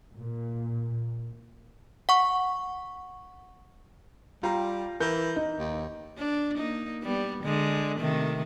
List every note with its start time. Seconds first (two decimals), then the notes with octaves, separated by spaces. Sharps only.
0.15 A#2
2.09 F#5 C#6
4.43 G3 F4 G5 A#5
5.00 E3 A#4 G6
5.36 D#4
5.59 D#2
6.18 D4
6.57 A#3 D#4
7.02 G3 B3
7.43 D3 G#3
7.99 C3 D#3 A3